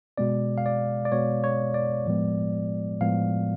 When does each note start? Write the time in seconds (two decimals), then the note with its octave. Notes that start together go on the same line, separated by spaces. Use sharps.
0.18 B2 G#3 B3 D5
0.58 F5
0.66 D5
1.05 D5
1.12 B2 G#3 B3 C#5
1.44 C#5
1.74 D5
2.06 A2 F3 G#3 B3
3.01 A2 F3 G#3 B3 F5